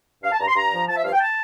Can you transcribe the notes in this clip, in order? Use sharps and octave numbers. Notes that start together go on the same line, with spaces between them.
G2 F5
A5
G2 A#5
C6
G2 A#5
F3
F3 A5
E5
G2 F5
G5
A5